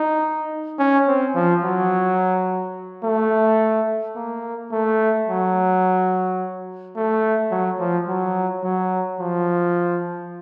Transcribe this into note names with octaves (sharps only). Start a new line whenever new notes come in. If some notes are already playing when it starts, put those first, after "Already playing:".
Already playing: D#4
C#4
C4
F3
F#3
A3
A#3
A3
F#3
A3
F#3
F3
F#3
F#3
F3